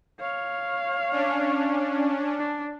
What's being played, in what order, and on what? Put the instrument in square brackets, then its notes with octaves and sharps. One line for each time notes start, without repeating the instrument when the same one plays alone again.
[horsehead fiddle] C#5 F5
[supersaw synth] C#4 D4
[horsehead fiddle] D4